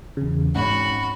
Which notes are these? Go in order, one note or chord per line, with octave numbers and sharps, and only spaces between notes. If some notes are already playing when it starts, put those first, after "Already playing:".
E2 C#3
G#1 C#4 F#4 F#5 B5